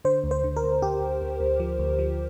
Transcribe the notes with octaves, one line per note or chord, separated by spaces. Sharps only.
D3 C5
D2
C5
D3
A#4
D2
D2 G4
D2
D2
D2
F3
D2
F3